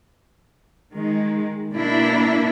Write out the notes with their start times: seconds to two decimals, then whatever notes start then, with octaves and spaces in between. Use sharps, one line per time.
0.93 D#3 G#3
1.73 B2 A#3 D4 E4